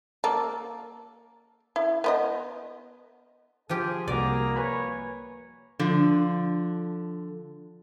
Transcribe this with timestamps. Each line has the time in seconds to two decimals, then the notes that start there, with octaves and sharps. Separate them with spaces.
0.24 A#3 A4
1.76 E4
2.04 B3 C5 D#5
3.69 F3 F4 G4 G#4
4.08 C2 A#3 F#4 D5 A#5
4.56 B4 C#5 G#5 B5
5.79 D3 F3